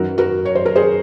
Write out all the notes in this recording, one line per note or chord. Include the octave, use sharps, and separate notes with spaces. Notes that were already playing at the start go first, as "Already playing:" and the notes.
Already playing: F#2 D#3 F#3 F#4 A#4
F#4 A#4
C#5
C5
A#4
G#4 C5